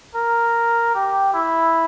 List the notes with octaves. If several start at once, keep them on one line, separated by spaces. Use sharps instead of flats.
A#4
G4
E4